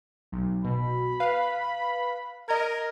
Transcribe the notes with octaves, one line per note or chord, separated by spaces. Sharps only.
B1
B2 B5
B4 F5
A#4 D#5 A#5 G#6